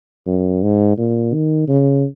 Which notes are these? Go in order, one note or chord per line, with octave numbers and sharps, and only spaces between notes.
F#2
G#2
A#2
D#3
C#3